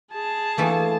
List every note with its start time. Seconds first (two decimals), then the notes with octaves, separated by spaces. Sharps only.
0.13 G#4 A5
0.58 E3 A3 A#3